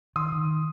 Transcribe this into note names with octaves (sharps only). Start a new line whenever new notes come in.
D#3 C6 D#6
D#3